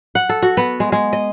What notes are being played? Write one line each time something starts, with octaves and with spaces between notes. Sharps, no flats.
F#5
A4
F#4
B3
G#3
G#3
D#5